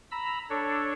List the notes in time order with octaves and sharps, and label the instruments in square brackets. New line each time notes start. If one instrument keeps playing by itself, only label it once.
[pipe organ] A#5 B5 E6
D4 A4 C#5